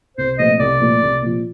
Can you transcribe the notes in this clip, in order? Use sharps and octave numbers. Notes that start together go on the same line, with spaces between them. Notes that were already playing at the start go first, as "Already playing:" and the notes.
C2 C5
A#2 F3 A3 C4 D#5
C2 D5
A#2 F3 A3 C4
C2
A#2 F3